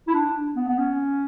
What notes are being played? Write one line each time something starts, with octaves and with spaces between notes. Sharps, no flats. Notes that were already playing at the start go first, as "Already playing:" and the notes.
E4
D4
B3
B3
C#4